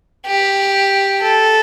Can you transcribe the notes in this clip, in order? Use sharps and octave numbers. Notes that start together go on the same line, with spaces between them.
G4
A4